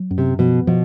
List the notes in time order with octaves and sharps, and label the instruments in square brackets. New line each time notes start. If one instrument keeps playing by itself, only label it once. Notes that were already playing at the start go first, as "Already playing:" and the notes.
Already playing: [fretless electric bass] F#3
F#2
[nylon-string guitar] C3
[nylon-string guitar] B2 [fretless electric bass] F3
[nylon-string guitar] B2 [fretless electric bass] F3